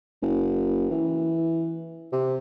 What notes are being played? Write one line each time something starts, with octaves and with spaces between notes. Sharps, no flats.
F#1
E3
C3